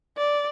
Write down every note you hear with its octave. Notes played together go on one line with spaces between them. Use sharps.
D5